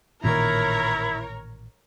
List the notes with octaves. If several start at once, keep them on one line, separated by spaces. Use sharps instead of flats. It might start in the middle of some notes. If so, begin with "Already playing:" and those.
A1 A#2 D#3 E4 A#4 C#5 A#5